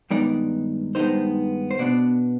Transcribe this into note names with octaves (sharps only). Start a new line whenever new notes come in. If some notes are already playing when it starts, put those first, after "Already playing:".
G2 D#3 G#3 B3 D#4 D5
G2 D#3 G#3 B3 D#4 C5
C5
B2 B3 D4 D5